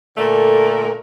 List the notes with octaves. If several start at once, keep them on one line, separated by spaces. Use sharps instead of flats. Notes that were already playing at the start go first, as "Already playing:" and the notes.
A#2 D3 A3 A#4